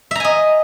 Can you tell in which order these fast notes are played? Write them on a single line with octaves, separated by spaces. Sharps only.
E5 A#5 G#5 D#5